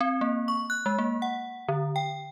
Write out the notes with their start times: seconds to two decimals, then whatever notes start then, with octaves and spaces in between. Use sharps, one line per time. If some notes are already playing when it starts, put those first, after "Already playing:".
0.01 C4
0.21 A#3
0.48 C#6
0.70 F#6
0.86 G#3
0.98 A#3
1.22 F#5
1.68 D3
1.96 G5